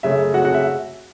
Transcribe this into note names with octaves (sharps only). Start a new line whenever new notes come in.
F#2 C#3 A3 C#4 E5
F#4 F#5
F#4 F#5
E5